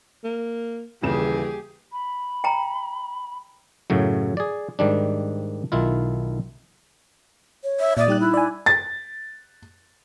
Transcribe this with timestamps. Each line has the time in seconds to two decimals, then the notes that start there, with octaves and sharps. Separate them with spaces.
0.24 A#3
1.03 D#1 C#3 E3 G4 G#4 E7
1.92 B5
2.44 G5 A#5
3.90 F#2 A2 C#3 F#3
4.37 G#4 D5
4.79 G#2 D#3 G3 D4
5.72 B1 D#3 E4 F4
7.64 C#5
7.80 E5
7.97 A#2 D5 E5 D#6
8.08 G3 D#4 G4 F#6
8.20 E4
8.34 D5 G#5
8.66 A6